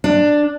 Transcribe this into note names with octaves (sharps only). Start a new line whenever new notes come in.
D4